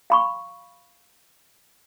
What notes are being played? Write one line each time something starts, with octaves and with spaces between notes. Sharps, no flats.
F5 B5 C#6